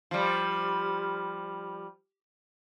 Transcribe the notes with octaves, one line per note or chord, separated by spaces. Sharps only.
F3 G3